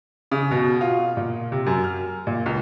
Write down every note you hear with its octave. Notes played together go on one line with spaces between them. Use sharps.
C#3
B2
F4
A#2
C3
F#2
F6
A#2
C#2